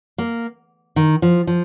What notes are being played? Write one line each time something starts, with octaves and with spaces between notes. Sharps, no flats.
A#3
D#3
F3
F3